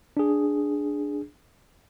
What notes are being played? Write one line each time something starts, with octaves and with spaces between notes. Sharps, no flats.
D4 G#4